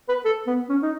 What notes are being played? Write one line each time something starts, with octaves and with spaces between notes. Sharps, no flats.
B4
A4
B3
C#4
D#4